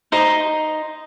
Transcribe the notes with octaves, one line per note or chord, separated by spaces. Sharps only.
D#4 C5 D#5 A#5